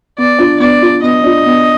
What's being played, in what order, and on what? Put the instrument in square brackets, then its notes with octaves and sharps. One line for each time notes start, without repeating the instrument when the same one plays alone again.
[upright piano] B3 [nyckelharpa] D5
[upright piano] D4 F4
[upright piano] B3 [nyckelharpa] D5
[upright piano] D4 F4
[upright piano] B3 [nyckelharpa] D#5
[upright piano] D4 F4
B3